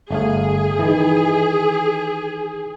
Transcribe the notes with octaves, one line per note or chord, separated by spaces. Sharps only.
G1 A3 G#4 F5
D#3 E3